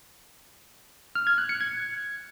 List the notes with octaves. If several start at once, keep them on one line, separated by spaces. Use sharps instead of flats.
F6
G#6
F#6
C#7
G#6